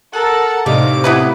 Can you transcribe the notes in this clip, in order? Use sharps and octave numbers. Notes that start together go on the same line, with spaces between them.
A4 A#4 F#5
A2 C3 D4 D#4 F5 D6
B3 E4 B4